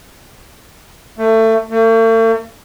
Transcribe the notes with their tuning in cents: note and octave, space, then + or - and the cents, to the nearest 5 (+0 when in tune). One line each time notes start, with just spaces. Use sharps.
A3 +25
A3 +45